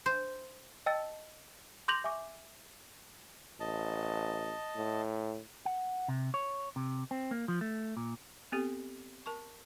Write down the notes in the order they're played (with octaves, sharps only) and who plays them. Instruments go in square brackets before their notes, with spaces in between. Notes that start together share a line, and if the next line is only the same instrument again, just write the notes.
[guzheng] C5
[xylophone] D#5 G5 A5 E6 A6
C6 D6 G6 A#6 F7 F#7
E5 G#5 C#6 D6
[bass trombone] A1 [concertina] D#5 A5
[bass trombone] A2
[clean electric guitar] F#5
C3
C#5
C3
C4
A#3
F3
A3
A#2
[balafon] B3 C4 G4 A4
A#4 A5 C#6